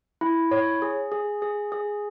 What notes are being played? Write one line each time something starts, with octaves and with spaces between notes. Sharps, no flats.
E4
C#5
G#4
G#4
G#4
G#4